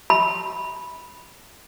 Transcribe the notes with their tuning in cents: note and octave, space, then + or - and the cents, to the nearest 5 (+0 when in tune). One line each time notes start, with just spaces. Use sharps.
B5 -10